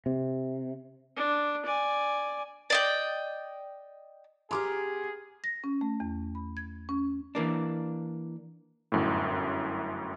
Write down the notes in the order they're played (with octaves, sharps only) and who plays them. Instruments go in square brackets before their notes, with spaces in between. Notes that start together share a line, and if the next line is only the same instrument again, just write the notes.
[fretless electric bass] C3
[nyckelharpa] D4
D5 G#5
[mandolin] D5 D#5 G5
[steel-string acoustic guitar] B3 G4 A#5 [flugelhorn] G#4 [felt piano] C6 D6 F6
[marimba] A#6
C#4
A3
E2
B5
G#6
C#4
[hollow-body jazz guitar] E3 A#3 D4
[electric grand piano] G1 F#2 A2